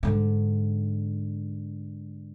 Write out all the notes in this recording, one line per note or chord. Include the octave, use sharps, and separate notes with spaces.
G#2 D3